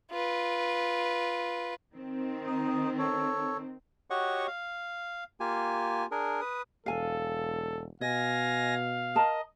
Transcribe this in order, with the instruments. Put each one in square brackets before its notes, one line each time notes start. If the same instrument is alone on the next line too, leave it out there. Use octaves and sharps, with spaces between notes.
[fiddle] F4 B4
[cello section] D#3 C4
[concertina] D#4 D#5
A4 C#5
F#4 G4 C#5 D#5 F#5 C#6
F5
A#3 F4 G4 G#5
D4 G#4 A#4
B4 D#6
[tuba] E1 [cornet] A4 [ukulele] F5 G#5
[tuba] B2 [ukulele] D#5 [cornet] F5 [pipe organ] G#5 A#6
[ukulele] A#4 A5 A#5 [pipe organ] D#5